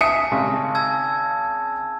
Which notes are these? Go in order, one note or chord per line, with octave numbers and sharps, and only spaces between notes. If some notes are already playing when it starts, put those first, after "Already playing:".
E5 G#5 A5 D#6 C#7
G#1 C#3 G#3
A5 E6 G#6